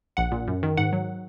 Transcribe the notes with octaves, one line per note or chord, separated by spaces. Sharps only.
A#1 F#5
A#2
F#2
D#3
G#2 F#5
F#3